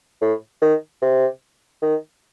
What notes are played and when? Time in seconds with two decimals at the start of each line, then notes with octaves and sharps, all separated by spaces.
0.21 A2
0.62 D#3
1.02 C3
1.82 D#3